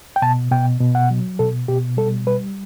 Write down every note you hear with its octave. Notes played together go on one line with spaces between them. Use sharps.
G5
B2 A5
B2 G5
B2
F#5
F#3
B2 A4
B2 G4
G3 A4
G3 B4